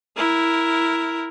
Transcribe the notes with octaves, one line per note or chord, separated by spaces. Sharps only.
E4 A#4